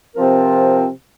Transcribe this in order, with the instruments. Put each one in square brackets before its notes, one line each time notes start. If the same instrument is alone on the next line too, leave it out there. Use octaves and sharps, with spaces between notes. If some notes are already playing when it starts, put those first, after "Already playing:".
[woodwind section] C3 F3 C4 F4 A#4